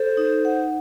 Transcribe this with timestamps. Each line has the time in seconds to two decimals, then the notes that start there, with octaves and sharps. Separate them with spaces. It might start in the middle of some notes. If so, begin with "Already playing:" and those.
Already playing: A4 C5
0.17 D#4
0.45 F#5